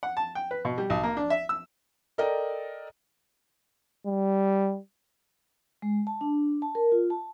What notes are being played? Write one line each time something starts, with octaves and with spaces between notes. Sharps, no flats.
F#5
A5
G5
B4
B2
G3
B1
A#3
D4
E5
E6
A4 A#4 D5 D#5 G5
G3
G#3
A5
D4
A5
A#4
F4
A5